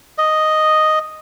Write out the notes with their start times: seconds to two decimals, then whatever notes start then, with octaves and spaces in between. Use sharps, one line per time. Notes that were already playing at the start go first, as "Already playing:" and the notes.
0.18 D#5